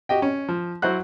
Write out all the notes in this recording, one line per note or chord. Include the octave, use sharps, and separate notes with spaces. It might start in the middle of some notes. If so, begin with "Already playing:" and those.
F#4 G4 D#5 G5
C#4
F3
F#3 E4 F#4 C5 F#5 F#6